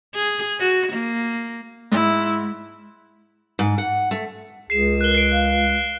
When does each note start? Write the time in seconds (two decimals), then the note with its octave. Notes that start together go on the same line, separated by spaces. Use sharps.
0.15 G#4
0.59 F#4
0.93 A#3
1.92 G#2 E4
3.59 G#2
3.78 F#5
4.11 A3
4.70 C#2 G#4 C7 E7
5.01 A#4 F#6 G7
5.15 C7 D7
5.32 F5